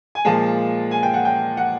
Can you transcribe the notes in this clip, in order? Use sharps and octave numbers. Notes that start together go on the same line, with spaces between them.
G#5
A#2 F3 G#3 A5
G#5
G5
F#5
G5
F#5